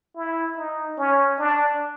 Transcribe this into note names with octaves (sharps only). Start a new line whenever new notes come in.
E4
D#4
C#4
D4